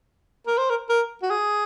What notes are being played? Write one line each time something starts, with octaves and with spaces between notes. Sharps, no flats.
A#4
C5
A#4
A#4
F#4
G#4